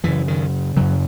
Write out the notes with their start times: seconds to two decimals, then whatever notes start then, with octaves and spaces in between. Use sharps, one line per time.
0.04 F#2 C#3 E3
0.28 D#3
0.76 F#2 C#3 F#3